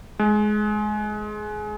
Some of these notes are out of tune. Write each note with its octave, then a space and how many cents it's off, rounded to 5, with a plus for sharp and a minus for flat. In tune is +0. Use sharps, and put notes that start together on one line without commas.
G#3 +20